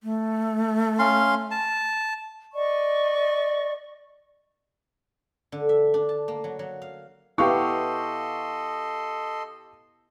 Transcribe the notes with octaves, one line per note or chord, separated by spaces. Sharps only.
A3
C#4 F5 C6
A5
D5 D#5 C#6
D3
E5
D4
A5
A#3
F#3
F#3
F5
B3 E4 G4 A4 D#5 F5 C6 C#6